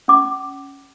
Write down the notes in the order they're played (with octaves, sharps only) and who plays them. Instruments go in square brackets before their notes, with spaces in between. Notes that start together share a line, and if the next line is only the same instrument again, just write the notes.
[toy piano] C#4 D6